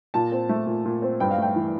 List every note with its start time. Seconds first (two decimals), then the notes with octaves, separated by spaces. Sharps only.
0.14 A#2 A5
0.32 C4
0.49 A3
0.67 A#2
0.85 A#2
1.02 C4
1.20 G2 G5
1.31 F5
1.38 A3 G5
1.56 E3